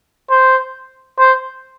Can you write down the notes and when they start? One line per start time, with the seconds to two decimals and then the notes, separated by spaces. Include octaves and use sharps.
0.30 C5
1.19 C5